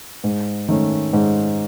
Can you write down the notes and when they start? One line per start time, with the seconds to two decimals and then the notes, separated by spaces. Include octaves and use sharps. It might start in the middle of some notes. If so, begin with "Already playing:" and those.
0.24 G#2
0.68 D#3 A3 C#4
1.13 G#2